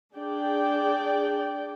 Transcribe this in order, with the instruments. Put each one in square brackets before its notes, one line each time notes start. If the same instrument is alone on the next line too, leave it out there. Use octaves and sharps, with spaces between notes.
[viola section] D4 G#4 D5 G5